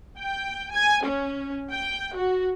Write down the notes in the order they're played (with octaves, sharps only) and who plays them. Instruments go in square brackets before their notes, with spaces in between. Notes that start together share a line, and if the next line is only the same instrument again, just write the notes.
[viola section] G5
G#5
C#4
G5
F#4